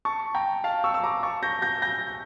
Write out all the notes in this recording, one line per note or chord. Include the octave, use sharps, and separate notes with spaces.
A5 C#6
G5 A#5
F5 A5
C#6 E6
E6
A#5 D6
A5 C#6
G6 A#6
G6 A#6
G6 A#6